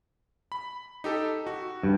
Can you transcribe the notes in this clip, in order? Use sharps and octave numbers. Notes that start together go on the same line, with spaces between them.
B5
D#4 G4 A4
F#4
G2